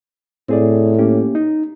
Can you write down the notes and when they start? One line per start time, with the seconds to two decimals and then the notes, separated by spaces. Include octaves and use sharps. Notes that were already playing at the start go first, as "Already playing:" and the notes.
0.49 A2 C4 G#4 D5
0.99 A#3 C#4 G4
1.35 D#4